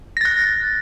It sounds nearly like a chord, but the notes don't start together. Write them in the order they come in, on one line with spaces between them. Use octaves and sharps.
A#6 A6 F#6